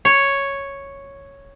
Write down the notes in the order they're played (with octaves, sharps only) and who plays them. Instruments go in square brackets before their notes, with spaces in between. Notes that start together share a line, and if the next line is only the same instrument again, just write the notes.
[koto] C#5